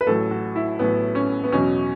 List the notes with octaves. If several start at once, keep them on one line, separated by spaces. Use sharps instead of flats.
B4
A1 A2 F#3 A4
F#4
E4
A1 A2 F#3 B3
C#4
B3
E2 B2 F#3 C#4